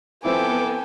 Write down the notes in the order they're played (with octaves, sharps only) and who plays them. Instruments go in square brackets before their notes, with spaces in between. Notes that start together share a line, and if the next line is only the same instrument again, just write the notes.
[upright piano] F3 C4 E4 [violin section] B3 A4 [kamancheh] G5 G#5 [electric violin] D6